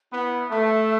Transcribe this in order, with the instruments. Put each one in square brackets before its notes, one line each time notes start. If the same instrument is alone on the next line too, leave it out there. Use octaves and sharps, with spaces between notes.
[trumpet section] B3 [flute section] E4
[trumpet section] A3 [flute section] E5